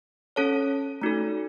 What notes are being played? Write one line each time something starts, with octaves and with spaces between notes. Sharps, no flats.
C#4 A4 C#5 A5
A3 D#4 F#4 A4